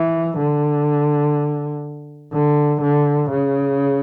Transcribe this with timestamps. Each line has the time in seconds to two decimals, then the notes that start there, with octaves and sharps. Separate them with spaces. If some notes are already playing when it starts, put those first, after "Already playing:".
Already playing: E3
0.38 D3
2.33 D3
2.81 D3
3.30 C#3